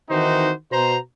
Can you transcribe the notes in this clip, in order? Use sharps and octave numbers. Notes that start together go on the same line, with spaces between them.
D#3 E3 C4 D#4 F#4 C5
B2 C5 A#5